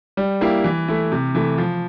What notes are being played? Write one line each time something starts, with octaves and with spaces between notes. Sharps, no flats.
G3
A#3 E4 G4
E3
A3 E4
C3
E3 A3
F3